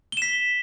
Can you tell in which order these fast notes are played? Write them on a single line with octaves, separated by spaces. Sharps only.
G7 E7 B6